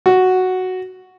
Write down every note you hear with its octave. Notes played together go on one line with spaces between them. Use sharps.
F#4